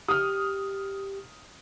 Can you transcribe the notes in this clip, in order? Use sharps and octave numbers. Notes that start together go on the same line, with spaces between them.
G4 D#6 F6